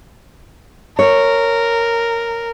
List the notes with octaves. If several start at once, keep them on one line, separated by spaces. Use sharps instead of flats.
A#4 C#5